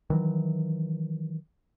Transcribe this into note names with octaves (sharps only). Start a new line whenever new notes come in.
D#3 E3 F#3